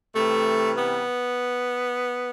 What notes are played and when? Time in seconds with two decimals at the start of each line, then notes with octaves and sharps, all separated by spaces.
0.15 C3 E3 G3 A3
0.78 B3